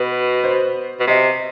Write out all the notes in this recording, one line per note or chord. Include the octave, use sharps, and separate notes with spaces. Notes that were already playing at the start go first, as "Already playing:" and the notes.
Already playing: B2 B4
C5
B2
C3 D#5